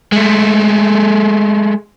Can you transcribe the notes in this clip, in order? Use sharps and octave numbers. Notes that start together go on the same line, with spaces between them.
G#3 A3